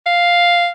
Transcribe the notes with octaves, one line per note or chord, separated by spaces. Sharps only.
F5